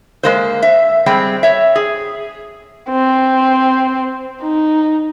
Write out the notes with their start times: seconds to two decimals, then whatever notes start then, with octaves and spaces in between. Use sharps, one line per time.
0.23 G#3 A#3 C5
0.62 E5
1.06 G3 G#3 C4 G5
1.43 C#5 E5
1.76 G#4
2.89 C4
4.42 D#4